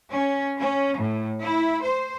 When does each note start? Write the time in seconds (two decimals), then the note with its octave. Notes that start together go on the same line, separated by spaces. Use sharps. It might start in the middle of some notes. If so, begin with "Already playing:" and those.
0.11 C#4
0.59 C#4
0.98 A2
1.42 E4
1.82 C5